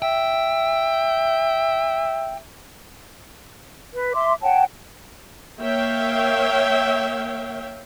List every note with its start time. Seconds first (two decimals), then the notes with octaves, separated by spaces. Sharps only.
0.02 E5 G5
3.94 B4
4.14 E5 C6 D6
4.42 C#5 F#5 G5 A5
5.60 A#3 C#5 E5 F5 G5